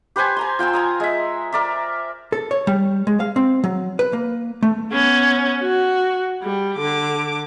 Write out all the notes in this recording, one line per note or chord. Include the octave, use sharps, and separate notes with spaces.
G4 B4 C5 G#5
G#5 A#5 C6
F4 G5 G#5 E6
G#5 A#5 D#6
G#3 E5
A#4 D5 E5
A4
C#5
G3
G#3
F5
C4
F#3
B4
A#3
A3
B3 C#4
F#4
G3
D3 D6